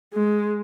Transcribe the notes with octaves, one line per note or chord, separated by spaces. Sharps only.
G#3